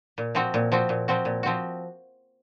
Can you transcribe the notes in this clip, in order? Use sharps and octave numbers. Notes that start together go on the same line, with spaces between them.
A#2
F3 C4 F#4
A#2
F3 C4 F#4
A#2
F3 C4 F#4
A#2
F3 C4 F#4